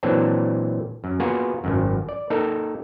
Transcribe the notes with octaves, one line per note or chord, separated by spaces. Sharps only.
A#2 E3 F#3 C4 D4 A5
F#2
A#3 B3 F4 F#4 G#4 A#4
G#1 F#2
D5
A#3 D#4 A4 A#4